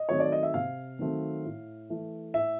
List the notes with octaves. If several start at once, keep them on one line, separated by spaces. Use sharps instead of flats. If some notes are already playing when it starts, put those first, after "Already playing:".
Already playing: D#5
D#3 F#3 A3 C4 C#5
D5
D#5
E5
C3 F5
D#3 F#3 A3 C4
A2
E3 A3
A2 E5